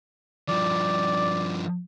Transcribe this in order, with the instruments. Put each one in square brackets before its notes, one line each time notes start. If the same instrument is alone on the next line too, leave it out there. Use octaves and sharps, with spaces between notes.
[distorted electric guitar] G2 F3 [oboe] D5